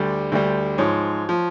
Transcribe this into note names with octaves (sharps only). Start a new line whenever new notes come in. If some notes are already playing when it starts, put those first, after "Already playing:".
Already playing: D2 D3 G3 D5
D2 D3 G3
G#2 F3 C#5
F3